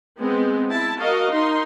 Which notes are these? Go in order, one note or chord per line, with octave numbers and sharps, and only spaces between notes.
G#3 B3 C4
E4 A5
F#4 A#4 D#5 F5
D#4 C6